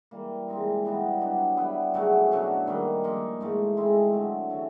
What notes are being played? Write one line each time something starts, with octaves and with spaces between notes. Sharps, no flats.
E3 G3 A#3
E3 G#3 C4 D#4
E3 G3 B3 D#4
F#3 B3 D4 G4
G3 B3 E4
C#3 F#3 A3
B2 F#3 A3 D4
D#3 G3 A#3
F3 A#3 D#4
G#2 E3 A3
G#3 C4 E4 G#4
D3 F#3 A3
E3 A3 C#4